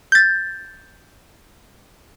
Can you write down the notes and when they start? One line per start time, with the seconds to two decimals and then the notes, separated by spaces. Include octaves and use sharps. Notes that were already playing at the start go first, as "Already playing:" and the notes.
0.12 G6 A6